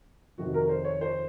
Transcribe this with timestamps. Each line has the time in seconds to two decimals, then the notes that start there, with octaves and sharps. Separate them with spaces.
0.38 F2 C3 D#3 F#4
0.54 A#4
0.69 C5
0.85 C#5
1.01 C5